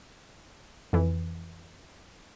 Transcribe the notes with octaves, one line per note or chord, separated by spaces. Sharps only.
F2 E3